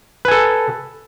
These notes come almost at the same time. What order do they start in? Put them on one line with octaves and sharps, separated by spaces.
B4 G#5 A4